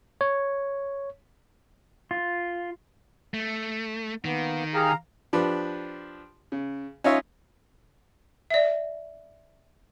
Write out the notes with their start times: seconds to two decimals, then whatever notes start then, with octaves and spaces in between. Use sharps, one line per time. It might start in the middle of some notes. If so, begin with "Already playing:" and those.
0.21 C#5
2.11 F4
3.34 A3
4.25 D#3 A#3 B3
4.74 G4 G#4 F5 A#5
5.33 F3 D4 G4 B4
6.52 C#3
7.04 C#4 D#4 F4 C#5 E5
8.50 D5 E5